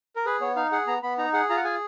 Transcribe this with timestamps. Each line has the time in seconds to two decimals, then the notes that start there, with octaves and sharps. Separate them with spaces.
0.16 A#4
0.26 G#4 B4
0.41 B3 C#5
0.56 D#4 F5
0.72 G#4 F#5
0.87 B3 A#5
1.03 B3 B5
1.18 D#4 A#5
1.33 G#4 F#5
1.50 F4 A#5
1.57 F#5
1.64 G#4 G#5